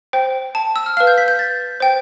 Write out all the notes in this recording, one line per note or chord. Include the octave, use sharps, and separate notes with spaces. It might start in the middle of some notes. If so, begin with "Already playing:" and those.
C5 G5
A5
E6
F6
B4 F5 F6
G6
B6
G6
A6
C5 G5